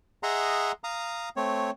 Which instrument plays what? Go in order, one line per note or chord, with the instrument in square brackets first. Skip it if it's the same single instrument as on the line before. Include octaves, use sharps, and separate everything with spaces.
[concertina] G#4 D#5 E5 F#5 A#5 C6
F5 A#5 D#6
A3 C4 C#5